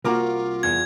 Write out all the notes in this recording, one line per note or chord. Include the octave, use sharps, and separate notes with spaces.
C2 A#3 F4 F#4 A#4 D6
E2 G#6